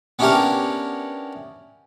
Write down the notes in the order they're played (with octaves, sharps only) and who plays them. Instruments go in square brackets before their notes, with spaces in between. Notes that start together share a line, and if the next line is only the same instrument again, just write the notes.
[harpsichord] B3 C#4 D4 E4 G4 A#4